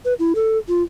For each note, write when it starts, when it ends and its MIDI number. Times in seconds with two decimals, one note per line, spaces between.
0.05 0.14 71
0.19 0.33 64
0.35 0.58 69
0.68 0.83 65